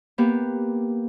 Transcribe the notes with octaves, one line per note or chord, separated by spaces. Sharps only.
A#3 B3 G4